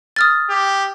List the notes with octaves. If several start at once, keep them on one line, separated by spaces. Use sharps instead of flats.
D#6 F6 A6
G4